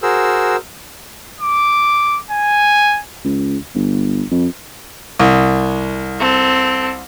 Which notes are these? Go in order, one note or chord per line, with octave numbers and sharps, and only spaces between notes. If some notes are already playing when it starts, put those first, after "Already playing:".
F#4 G#4 A#4 C5 E6
D6
G#5
C#2
G1
F2
C2
C4 A4